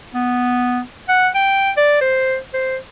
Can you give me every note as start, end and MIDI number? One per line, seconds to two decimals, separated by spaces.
0.14 0.81 59
1.09 1.29 78
1.35 1.71 79
1.77 2.00 74
2.01 2.37 72
2.54 2.77 72